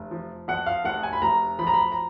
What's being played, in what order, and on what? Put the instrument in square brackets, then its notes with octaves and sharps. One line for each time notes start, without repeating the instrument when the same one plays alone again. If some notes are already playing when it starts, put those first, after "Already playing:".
Already playing: [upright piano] F1
F3
F2 F#5
F5
F1 F#5
G#5
B5
F1 A#5
F3 B5
A#5
B5
A#5